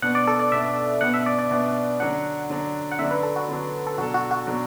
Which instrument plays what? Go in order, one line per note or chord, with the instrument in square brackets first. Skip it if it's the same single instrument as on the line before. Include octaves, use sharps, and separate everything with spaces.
[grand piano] B2 B3 D4 [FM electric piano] F#5
[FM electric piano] D5
A4
D5
[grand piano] B2 B3 D4 [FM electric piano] E5
[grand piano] B2 B3 D4 [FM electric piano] F#5
[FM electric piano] E5
D5
D5
[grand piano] B2 B3 D4
[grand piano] D3 F#3 D4 [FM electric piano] F#5
[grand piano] D3 F#3 D4
[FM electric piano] F#5
[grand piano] D3 F#3 D4 [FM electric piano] E5
[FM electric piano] B4
A4
F#4
[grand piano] D3 F#3 D4
[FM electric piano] A4
[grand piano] B2 F#3 D4 A4 [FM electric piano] F#4
[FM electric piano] F#4
F#4
[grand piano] B2 F#3 D4 A4